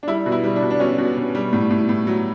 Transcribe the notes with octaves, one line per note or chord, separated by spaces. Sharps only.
D4
G3 E4
B2
E4
G3
D4
B2
D4
B2 C#4
B2
B2
G3
A2
A2
A2
F#3